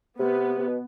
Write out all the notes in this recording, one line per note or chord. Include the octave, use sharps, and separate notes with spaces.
C3 B3
C3
B2